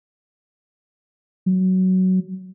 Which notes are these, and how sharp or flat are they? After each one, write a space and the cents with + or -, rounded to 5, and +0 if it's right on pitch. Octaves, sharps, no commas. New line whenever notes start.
F#3 +10